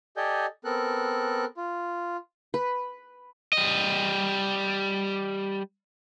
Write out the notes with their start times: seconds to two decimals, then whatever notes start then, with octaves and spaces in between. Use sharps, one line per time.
0.17 G4 A4 D5 D#5 G#5 G6
0.65 B3 C4 A4 A#4 F#6
1.57 F4
2.54 B4
3.53 G3 D#5